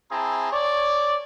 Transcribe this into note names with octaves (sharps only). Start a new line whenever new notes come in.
C4 E4 G#4 A5 A#5
C#5 D5